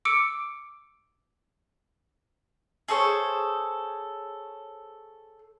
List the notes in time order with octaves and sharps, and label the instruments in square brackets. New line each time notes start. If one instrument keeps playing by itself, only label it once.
[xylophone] D6 E6 C#7 D7
[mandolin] G#4 A4 C5 C#5